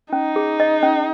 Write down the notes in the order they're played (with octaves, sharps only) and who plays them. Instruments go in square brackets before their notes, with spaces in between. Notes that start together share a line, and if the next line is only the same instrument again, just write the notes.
[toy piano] C#4 [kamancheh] D#4
[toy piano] G#4
D#5
C#4